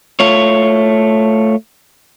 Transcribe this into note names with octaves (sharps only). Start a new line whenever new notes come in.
A3 F4 C#5